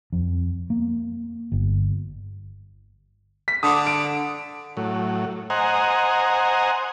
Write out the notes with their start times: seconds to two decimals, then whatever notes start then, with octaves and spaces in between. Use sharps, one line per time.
0.13 F2
0.70 A#3
1.52 G1
3.48 B6
3.63 D3 D6 D#6
3.87 D7
4.77 A2 F#3
5.50 C5 D#5 F#5 G#5 A#5